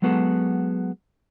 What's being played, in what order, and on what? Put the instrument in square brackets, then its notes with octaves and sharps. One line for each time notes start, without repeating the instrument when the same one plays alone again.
[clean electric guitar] F#3 G#3 B3 F#4 G#4 A4